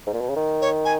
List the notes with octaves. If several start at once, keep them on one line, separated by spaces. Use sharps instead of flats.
G#2
A#2
B2
C#3
D#3
C#5
G#5